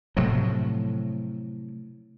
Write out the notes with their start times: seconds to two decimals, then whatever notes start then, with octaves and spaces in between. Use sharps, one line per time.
0.17 A2 C3 F3 F#3